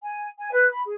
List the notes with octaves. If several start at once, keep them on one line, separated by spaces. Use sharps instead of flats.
G#5
G#5
B4 F#6
B5
G#4